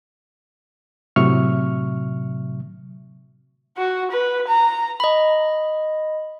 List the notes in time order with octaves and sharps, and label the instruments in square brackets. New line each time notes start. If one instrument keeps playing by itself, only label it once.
[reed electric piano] A2 C3 F#3 E5 C#6 F6
[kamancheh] F#4
B4
A#5
[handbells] D#5 B5